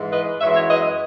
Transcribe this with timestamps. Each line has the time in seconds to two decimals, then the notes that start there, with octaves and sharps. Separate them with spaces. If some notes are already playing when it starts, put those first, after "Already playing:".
Already playing: G#2 E3 G#3
0.11 B4 D#5
0.39 F#2 E3 G#3 C#5 E5
0.54 C#5 E5
0.68 B4 D#5